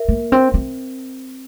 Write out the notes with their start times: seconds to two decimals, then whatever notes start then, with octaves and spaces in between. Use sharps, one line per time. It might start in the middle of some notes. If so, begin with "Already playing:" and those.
Already playing: A#4 E5
0.08 A#3
0.32 C4
0.54 C4